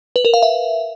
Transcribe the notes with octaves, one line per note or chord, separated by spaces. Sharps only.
B4
A#4
F5
E5